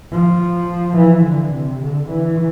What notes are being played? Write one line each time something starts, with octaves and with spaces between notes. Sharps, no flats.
F3
E3
D3
C3
D3
E3